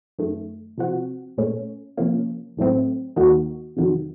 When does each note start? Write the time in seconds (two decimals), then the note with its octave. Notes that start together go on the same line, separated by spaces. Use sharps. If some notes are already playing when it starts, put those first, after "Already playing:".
0.19 F#2 D#3 A3
0.78 C3 F3 C4 F#4
1.37 A#2 A3 C#4
1.97 C3 F3 A#3 C#4
2.57 A1 A2 F#3 A3 C4
3.16 D#2 D#3 A#3 D#4 F#4
3.77 F2 C3 D#3 F#3